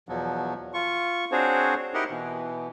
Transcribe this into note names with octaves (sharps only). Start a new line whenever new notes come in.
E2 B2 F3 F#3
F4 C#6
C4 D4 F#4 G#4 C5 C#5
D#4 E4 G4 A#4 D#5 F#5
B2 E3